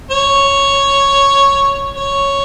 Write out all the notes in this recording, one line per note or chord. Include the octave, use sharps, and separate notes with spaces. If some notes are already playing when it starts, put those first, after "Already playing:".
C#5
C#5